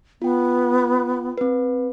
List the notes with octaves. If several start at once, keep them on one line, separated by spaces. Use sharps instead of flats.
B3 F4 G5
C4 B4